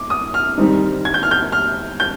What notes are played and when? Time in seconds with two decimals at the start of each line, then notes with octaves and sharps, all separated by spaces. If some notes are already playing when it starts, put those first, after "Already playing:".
Already playing: D6
0.10 D#6
0.34 F6
0.58 G#2 D#3 G3 C4 D#4
1.05 G#6
1.14 G6
1.23 F6
1.31 G6
1.52 F6
2.00 G6